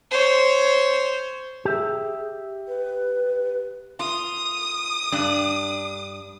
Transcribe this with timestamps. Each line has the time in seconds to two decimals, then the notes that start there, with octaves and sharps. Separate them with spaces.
0.11 C5 C#5
1.65 G4 G#4 E5
2.68 B4
3.99 F4 D#6
5.12 G2 D4